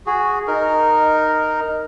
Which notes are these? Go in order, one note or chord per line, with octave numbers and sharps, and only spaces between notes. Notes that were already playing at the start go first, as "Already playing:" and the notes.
F#4 G#4
D#4 A#4